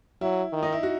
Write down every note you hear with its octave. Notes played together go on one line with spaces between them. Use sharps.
F#3 E4
D#3
D#4
E4
F#4